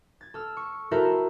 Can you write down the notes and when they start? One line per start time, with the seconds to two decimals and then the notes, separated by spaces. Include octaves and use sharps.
0.21 G#6 A6
0.34 A4 E6 F6
0.57 C#6
0.91 E4 F#4 A4 A#4 C5 E5